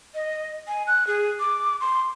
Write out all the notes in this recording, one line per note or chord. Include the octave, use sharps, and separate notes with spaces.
D#5
G#5
F#6
G#4
D6
C6